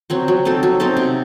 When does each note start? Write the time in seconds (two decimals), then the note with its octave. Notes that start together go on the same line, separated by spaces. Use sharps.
0.10 F#3 C4 F#4
0.28 F#3
0.45 C4 D#4 A4
0.63 F#3
0.80 C4 D#4 A4
0.97 C3